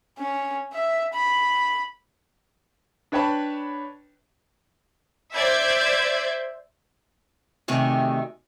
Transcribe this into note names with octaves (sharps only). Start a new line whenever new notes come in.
C#4
E5
B5
D4 B4 C#5 G5 A5 B5
C5 D5 E5 G6 G#6
D2 C3 D#3 A3 G4 G#5